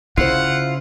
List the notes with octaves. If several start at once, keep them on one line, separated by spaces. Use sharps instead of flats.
C#3 E4 F4 C5 F#5